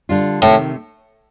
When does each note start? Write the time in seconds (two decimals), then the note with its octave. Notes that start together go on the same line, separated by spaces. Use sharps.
0.09 D3 G3 D4 F4
0.42 A2 C3 D#3 A3